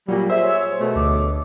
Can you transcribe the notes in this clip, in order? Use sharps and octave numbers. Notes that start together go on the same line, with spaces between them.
A#2 F#3 G3
G#4 C5 E5
C#5
B2 A3
D2 D6